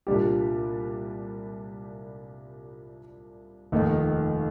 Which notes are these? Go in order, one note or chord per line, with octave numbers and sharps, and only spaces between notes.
C2 A#2 G3 D4 G4
F1 D#2 D#3 A#3 D#4